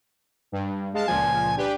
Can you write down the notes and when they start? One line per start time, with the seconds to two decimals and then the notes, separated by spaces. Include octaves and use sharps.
0.52 G2
0.94 G#3 F5 A5
1.08 C#2 A#2 F3 G#5
1.57 D4 G4 B4